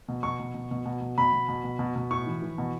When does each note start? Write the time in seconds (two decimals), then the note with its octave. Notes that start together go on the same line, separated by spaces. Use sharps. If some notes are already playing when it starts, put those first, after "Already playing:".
0.08 B2
0.23 B2 C#6
0.40 B2
0.54 B2
0.71 B2
0.86 B2
1.01 B2
1.18 B2 B5
1.33 B2
1.48 B2
1.64 B2
1.79 B2
1.96 B2
2.11 A2 C#6
2.27 E3
2.42 E3
2.58 B2